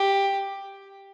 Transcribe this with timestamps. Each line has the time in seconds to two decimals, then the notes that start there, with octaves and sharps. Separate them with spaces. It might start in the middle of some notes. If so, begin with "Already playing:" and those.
Already playing: G4